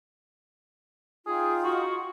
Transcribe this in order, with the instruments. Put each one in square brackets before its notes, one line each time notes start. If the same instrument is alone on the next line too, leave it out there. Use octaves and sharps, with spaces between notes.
[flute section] D#4 F4 G5 [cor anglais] G#4
[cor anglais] F#4